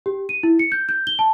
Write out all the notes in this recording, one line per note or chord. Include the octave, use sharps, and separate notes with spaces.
G4
D#7
E4
C#7
G6
G6
G7
A5